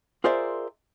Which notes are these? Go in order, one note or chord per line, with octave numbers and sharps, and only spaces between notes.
F4 G#4 A#4 C5 D5 E5